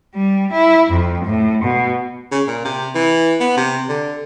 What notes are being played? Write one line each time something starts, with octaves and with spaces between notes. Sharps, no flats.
G3
E4
F2
A2
B2
C#3
A#2
C3
E3
B3
C3
D3